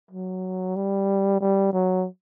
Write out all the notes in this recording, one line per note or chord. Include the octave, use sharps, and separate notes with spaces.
F#3
G3
G3
F#3